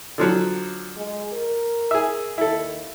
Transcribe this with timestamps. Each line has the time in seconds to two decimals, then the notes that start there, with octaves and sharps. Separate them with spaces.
0.18 D3 F3 F#3
0.97 G#3
1.33 A#4
1.91 G#4 E5
2.38 D#2 E4 A4